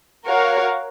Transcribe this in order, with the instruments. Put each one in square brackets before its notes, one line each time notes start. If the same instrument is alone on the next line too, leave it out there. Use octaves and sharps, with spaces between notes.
[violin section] F#4 A#4 C#5 F5